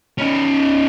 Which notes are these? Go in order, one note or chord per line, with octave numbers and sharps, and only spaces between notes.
C#4 D#4